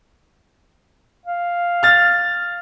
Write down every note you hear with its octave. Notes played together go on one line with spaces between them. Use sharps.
F5
F6 A6